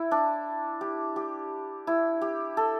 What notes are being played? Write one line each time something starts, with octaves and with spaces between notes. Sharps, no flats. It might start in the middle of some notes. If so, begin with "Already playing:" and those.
Already playing: E4
D4
G4
G4
E4
G4
A4